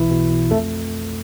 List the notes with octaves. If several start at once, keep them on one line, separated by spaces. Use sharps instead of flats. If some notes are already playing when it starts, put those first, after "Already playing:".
Already playing: B1 B2 E3 E4
B2
B2
F2 A3 A4